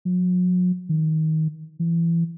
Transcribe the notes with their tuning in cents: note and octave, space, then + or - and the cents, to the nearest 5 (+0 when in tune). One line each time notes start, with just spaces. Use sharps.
F#3 -40
D#3 +20
E3 +25